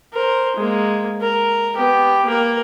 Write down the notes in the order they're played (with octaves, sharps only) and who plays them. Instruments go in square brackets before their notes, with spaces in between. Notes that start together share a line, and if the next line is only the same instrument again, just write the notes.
[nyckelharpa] A#4 C5
G#3 A#3
A#4
B3 G4
A#3 A#4